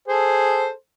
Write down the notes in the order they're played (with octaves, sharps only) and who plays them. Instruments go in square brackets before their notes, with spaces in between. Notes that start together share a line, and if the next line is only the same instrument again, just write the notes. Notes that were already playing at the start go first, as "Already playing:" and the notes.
[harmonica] G#4 A4 C5